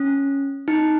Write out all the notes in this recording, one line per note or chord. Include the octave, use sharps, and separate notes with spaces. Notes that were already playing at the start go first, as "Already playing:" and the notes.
Already playing: C#4
D#4